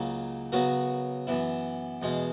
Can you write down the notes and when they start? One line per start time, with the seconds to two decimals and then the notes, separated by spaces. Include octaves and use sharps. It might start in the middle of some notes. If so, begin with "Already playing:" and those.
Already playing: C#2 C#3 F#3 A#3
0.52 C#3 F#3 B3 F#4 A#4
1.27 F#2 E3 B3 E4
2.02 E2 B2 G#3